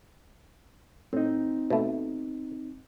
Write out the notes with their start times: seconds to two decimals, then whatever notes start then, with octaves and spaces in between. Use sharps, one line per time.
1.13 A2 C4 D#4
1.70 B2 A3